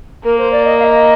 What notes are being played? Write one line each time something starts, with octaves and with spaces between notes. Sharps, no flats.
A#3 A#4
C5
D5
D#5
F5
D#5